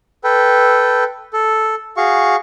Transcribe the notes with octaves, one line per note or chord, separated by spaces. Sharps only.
A4 B4 G5
A4
F#4 G#4 F5 C#6